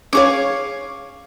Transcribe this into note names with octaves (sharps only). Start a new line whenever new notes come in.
C#4 G#4 C#5 F5 C#6 D6